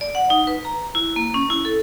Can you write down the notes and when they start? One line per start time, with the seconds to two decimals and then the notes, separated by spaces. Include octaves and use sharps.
0.01 D5
0.15 F#5
0.30 D#4
0.47 B4
0.65 A#5
0.95 E4
1.16 A#3
1.34 C#4
1.50 E4
1.65 A4